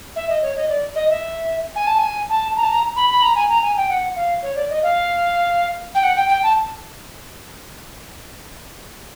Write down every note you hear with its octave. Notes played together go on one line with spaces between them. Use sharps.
E5
D#5
C#5
D#5
D5
D#5
E5
G#5
A5
G#5
A5
A#5
A5
A#5
B5
B5
A#5
G#5
A#5
G#5
G5
F#5
F5
C#5
D5
D#5
F5
G5
F#5
G5
G5
A5